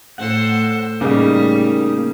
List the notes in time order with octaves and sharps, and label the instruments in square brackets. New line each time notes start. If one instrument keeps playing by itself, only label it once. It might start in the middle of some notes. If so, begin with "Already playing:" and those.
[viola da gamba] A2 A4 C5 [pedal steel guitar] F#5
[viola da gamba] A2 G3 [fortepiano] C#3 [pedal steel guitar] A#3 D#4